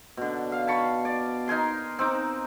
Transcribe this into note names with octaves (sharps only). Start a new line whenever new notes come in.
B2 D3
F5
A5 B5 C#6
D5
D#4 A#4 G#5 C6
C4 D#4 D6